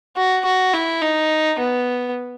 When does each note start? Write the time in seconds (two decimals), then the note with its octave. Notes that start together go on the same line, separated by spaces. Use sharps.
0.17 F#4
0.45 F#4
0.74 E4
1.02 D#4
1.59 B3